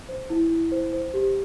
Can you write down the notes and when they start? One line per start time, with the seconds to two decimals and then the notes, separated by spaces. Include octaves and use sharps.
0.09 C5
0.30 E4
0.50 E4
0.72 C5
0.93 C5
1.14 G4